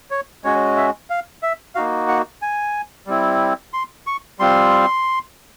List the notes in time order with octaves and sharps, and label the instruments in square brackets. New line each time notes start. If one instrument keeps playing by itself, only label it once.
[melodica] C#5
G#3 C#4 F#4 C#5
E5
F5
E5
A#3 D#4 F#4 F5
F#5
G#5
G3 C4 E4
C6
C#6
G3 C4 F4 C6